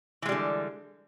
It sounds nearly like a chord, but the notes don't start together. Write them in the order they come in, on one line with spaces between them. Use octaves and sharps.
E3 G#3 G3 D3